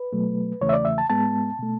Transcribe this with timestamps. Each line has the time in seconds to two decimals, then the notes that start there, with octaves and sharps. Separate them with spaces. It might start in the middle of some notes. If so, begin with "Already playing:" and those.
Already playing: B4
0.13 B2 F#3 A3
0.61 E2 C#3 E3 A3 C#5
0.69 E5
0.73 D5
0.85 E5
0.98 A5
1.10 G#2 G#3 B3 A5
1.59 B2 A3